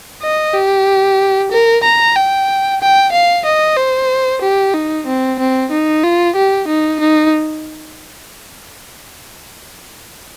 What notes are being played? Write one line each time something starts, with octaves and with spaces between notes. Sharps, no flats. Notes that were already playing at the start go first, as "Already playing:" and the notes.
D#5
G4
A#4
A#5
G5
G5
F5
D#5
C5
G4
D#4
C4
C4
D#4
F4
G4
D#4
D#4